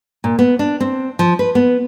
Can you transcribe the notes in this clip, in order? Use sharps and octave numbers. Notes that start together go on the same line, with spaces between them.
A#2
B3
D4
C4
F3
B4
B3